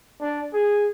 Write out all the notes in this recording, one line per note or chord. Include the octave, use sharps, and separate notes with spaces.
D4
G#4